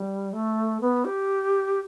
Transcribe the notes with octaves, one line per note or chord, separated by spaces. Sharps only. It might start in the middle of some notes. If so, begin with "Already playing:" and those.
Already playing: G3
A3
B3
G4